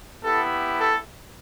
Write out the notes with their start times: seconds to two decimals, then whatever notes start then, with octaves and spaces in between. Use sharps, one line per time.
0.23 B3 E4 G4 A4
0.78 A4